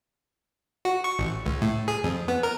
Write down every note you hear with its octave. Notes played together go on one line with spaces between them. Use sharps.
F#4
C#6
A1
C#2
A2
G#4
F2
B3
A#4